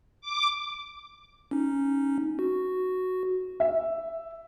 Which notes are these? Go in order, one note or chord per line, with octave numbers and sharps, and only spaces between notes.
D6
C#4 D#4
F#4
E5